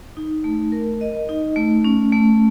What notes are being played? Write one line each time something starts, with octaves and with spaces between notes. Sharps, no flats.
D#4
A3
A#4
D#5
D#4
A3
C#4
A3